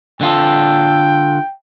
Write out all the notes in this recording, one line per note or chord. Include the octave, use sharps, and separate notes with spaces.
D3 F4 A4 G5